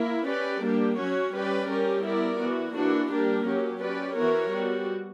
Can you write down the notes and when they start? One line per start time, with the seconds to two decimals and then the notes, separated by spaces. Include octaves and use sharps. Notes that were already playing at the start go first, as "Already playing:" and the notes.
Already playing: A#3 E4 A#4
0.27 C#4 G4 B4 D5
0.63 G3 A#3 D4 G4
0.98 F#3 C#4 F#4 C#5
1.33 G3 C#4 G4 B4 D5
1.69 G3 C#4 G4 A#4
2.04 B3 E4 A#4 D5
2.39 E3 B3 F#4
2.75 E3 A#3 D4 F#4
3.10 G3 A#3 D4 G4 A#4
3.46 F#3 C#4 G4
3.81 C#4 G4 B4 D5
4.16 E3 B3 F#4 A#4 C#5
4.51 G3 B3 F#4